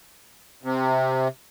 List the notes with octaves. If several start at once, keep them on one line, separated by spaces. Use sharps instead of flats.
C3